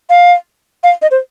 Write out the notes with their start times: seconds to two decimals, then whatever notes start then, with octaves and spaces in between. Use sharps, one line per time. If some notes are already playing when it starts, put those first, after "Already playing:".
0.10 F5
0.83 F5
1.02 D#5
1.11 C5